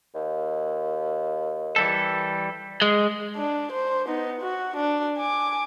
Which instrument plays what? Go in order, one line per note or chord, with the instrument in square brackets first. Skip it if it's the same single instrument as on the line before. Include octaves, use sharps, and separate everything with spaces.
[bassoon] D#2
[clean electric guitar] E3 G3 A4
[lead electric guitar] G#3
[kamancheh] D4
C5
B3 D#4
F#4
D4
G#5 D6